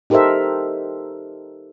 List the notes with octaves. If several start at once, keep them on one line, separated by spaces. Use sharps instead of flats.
D#4 G4 A4 A#4 C5 E5